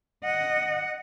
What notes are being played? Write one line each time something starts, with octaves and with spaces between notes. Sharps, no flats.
D#5 F#5